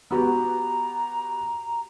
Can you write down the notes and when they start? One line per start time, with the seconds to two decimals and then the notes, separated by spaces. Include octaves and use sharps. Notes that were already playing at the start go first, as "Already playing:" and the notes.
0.11 B3 F#4 G4 A#5